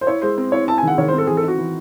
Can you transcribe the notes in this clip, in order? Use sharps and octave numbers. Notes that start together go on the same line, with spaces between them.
C5
E4 C#5
G#3 C5
C4
E4 C#5
E4 A5
G#5
D#3 F#5
D#3 C#5
C5
C4
A4
E3 G#4
A4
D#4 F#4
E3